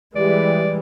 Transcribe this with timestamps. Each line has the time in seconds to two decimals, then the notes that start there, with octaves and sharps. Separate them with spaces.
0.16 E3 G3 G#3 G4 G#4 D5 E5